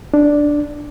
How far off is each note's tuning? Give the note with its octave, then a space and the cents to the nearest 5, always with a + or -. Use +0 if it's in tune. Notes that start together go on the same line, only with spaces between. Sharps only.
D4 +0